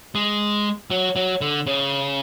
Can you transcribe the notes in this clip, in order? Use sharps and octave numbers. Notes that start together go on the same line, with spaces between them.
G#3
F#3
F#3
D3
C#3